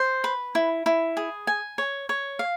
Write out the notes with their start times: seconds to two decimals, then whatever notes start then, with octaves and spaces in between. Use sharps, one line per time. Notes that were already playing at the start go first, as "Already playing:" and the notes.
Already playing: C5
0.24 B4
0.55 E4
0.86 E4
1.17 G#4
1.47 G#5
1.78 C#5
2.09 C#5
2.39 F5